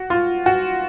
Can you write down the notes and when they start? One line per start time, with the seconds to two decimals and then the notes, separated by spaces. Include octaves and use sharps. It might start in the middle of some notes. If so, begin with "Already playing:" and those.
Already playing: F#4
0.10 F4
0.46 F#4